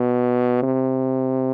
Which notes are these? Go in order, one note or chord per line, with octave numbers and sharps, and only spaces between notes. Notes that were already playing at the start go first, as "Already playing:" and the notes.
Already playing: B2
C3